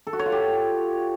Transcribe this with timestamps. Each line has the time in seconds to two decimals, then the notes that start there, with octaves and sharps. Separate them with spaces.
0.07 A4
0.13 F#4
0.19 C#5
0.26 F4
0.32 G4